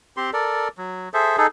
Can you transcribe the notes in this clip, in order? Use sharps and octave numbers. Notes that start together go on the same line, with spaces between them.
C4 G4 C6
A4 A#4 D5
F#3
G#4 A4 C5 E5
D#4 G#4 A4